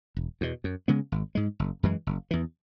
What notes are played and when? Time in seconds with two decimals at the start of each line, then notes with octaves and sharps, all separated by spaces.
0.17 E1
0.41 E2 B2
0.64 F#2
0.88 C#3 G#3 B3
1.12 G#1
1.35 G#2 G#3
1.59 F#1
1.83 F#2 E3 G#3
2.07 F#1
2.31 E2 E3